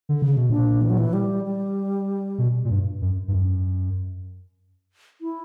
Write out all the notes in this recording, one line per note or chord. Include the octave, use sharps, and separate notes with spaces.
D3
C#3
B2
A#2 D4
E3
F#3
E3
G3
G3
B2
A#2
G2
F#2
G2
F#2
E4